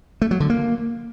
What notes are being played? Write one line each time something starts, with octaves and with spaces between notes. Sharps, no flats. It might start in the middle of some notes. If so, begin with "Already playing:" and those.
A3
F#3
D3
A#3